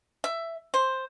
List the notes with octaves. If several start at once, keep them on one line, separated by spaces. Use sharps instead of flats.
E5
C5